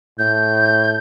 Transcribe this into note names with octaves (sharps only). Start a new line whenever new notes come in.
A2 G6